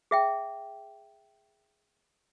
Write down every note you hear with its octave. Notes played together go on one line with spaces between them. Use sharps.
G#4 E5 G5